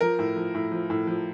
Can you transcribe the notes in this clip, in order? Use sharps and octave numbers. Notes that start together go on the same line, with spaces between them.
F3 A#4
A2
F3
A2
F3
A2
F3